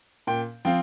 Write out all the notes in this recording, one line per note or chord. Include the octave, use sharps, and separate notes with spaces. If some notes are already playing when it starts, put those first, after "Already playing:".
A#2 G5
F3 C4 F4 G5